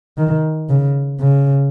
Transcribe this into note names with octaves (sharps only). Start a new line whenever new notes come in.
D#3
C#3
C#3